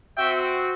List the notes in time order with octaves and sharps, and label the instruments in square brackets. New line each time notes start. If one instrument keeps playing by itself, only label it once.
[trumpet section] C4 F#4 E5 G5